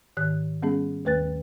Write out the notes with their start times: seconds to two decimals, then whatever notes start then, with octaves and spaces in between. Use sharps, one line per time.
0.17 G#2 D#3 F#6
0.62 G3 B3 C#4 G#4
1.05 D#2 D#3 A3 B4 F#6 A6